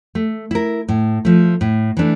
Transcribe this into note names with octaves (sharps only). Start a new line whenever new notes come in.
A3
E4 A#4
A2
F3 A3
A2
E3 A3 D4